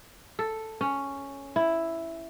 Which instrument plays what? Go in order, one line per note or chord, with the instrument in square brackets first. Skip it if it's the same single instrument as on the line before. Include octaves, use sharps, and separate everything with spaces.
[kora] A4
C#4
E4